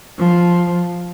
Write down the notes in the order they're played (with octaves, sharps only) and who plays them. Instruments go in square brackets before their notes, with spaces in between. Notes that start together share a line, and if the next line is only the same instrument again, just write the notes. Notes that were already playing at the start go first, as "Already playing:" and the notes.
[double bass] F3